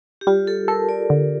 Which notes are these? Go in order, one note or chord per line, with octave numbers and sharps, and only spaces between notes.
G4
G3 F4
A4
A4 A#4
D5
D3